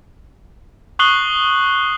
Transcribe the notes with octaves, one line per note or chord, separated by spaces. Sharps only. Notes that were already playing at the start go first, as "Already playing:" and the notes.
C#6 D#6 F#6 C7 F#7 G7